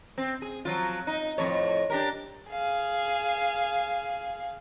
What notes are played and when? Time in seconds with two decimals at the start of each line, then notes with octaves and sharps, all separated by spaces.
0.18 C4
0.42 G#4
0.65 F3 F#3 F4
1.07 D#4
1.38 F2 A2 C#5
1.90 D4 G4 A#4
2.50 G#4 F5